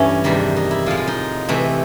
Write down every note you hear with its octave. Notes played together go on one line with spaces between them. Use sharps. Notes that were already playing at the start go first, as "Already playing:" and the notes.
Already playing: G2 E3 A3 C#4
E2 C3 D#3 G3 D4
D#4
E4
A2 F3 G#3 F4
F4
D#4
C3 E3 A3